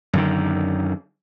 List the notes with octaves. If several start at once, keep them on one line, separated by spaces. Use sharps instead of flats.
F#2 D3 D#3